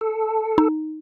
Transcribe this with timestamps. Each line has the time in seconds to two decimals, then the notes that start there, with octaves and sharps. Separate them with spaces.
0.01 A4
0.58 D#4